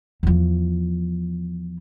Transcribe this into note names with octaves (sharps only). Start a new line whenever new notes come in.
E2 F3